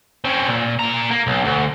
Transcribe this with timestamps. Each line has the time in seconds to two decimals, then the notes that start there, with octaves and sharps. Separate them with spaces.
0.25 C4 C#4
0.48 A#2
0.79 A#2 A#5
1.11 A#3
1.27 B1
1.44 D2